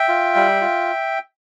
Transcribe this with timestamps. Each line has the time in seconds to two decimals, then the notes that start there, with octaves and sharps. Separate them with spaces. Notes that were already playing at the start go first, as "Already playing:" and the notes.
Already playing: E5 G5
0.09 F4
0.36 G3
0.61 F4